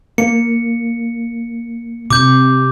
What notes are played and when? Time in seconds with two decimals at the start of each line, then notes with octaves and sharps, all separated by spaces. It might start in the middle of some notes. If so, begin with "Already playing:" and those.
0.18 A#3 C#7
2.10 C3 D6 G6